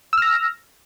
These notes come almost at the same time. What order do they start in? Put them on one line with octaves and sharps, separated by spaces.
E6 F6 A#6